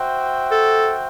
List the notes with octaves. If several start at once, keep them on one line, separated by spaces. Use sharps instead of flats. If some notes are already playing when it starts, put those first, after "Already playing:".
Already playing: F#4 C5 E5 G5
A4